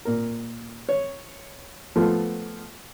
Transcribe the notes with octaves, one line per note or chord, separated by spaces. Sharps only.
A#2 A#4
C#5
F3 A3 B3 F4